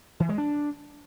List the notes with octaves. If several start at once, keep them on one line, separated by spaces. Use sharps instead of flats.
E3
G#3
D4